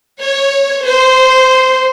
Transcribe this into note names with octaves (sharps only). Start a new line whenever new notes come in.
C#5
C5